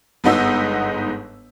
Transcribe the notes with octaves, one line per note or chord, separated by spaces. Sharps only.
G1 G#2 B3 D#4 F#5 E6